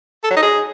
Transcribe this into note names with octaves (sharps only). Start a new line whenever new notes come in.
A4
F#3
D#4
G#4